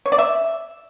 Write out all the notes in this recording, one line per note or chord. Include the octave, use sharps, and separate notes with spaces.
C#5
D5
E5